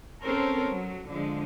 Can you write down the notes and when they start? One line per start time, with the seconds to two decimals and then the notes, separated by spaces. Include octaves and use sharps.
0.22 C4 C#4 A4 A#4 C5 C#5
0.67 F#3
1.09 D3 F3 G#3